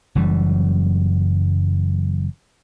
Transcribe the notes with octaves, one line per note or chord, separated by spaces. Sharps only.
F#1 F#2 E3 G3